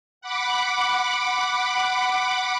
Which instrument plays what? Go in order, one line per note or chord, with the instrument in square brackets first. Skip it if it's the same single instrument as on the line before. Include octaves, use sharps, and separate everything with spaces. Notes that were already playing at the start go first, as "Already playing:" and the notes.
[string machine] F#5 B5 D6